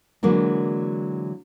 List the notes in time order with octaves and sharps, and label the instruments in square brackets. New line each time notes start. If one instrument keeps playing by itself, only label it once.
[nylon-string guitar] D3 E3 F#3 G#3 A#3